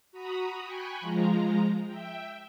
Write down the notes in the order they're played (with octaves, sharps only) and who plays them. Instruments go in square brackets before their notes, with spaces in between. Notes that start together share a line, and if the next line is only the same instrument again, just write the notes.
[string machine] F#4 A#5 B5 D#6
G5 G#5 B5 C#6 F#6
F3 G#3 F4 A#5
E5 G5